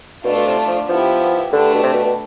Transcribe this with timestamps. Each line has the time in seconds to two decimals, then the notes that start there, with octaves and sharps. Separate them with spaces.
0.24 B2 A3 D4 F4
0.36 B2
0.47 C3
0.68 F3
0.88 F3 B3 E4 G4
1.52 D3 A3 D4 G4 B4
1.74 B2
1.83 C3
1.94 B2
2.05 B2